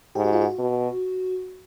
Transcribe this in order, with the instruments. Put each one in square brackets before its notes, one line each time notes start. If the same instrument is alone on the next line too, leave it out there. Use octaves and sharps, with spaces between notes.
[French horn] G#2 [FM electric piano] G4
[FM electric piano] F#4
F4
F#4
[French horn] B2